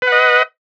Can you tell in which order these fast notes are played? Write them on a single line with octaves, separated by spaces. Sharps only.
B4 F#5 D#5